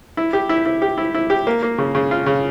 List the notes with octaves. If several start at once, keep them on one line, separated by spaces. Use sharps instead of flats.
E4
G4
E4
E4
G4
E4
E4
G4
A#3
A#3
C#3
C#3
F4
C#3